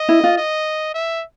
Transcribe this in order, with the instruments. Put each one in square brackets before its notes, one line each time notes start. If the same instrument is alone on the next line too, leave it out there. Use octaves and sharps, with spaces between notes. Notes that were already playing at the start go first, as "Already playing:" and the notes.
Already playing: [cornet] D#5
[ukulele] E4
F4
[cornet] D#5
E5